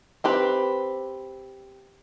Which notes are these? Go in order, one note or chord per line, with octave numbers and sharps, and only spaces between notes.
C4 G4 B4